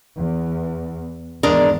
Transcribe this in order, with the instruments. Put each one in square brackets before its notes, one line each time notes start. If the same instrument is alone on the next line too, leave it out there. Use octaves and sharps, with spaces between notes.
[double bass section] E2
[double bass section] G#1 E2 [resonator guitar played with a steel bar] G#3 D4 A#4